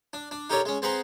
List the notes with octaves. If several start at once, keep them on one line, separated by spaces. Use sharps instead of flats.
D4
D4
D#4 G4 A4 A#4 C#5 D5
G#3 C#4
C4 G#4 B4 F#5 A#5 C6